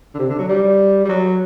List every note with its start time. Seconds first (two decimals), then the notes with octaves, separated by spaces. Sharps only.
0.14 D3
0.19 C3
0.29 D3
0.39 F#3
0.49 G3
1.05 G3
1.09 F#3